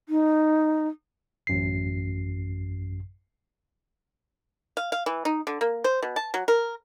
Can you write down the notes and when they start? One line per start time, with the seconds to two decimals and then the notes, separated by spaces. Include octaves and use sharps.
0.09 D#4
1.47 A1 F#2 C7
4.77 F5
4.92 F5
5.06 E3
5.25 D#4
5.47 D3
5.61 A#3
5.84 C5
6.03 B2
6.16 A5
6.34 F#3
6.48 A#4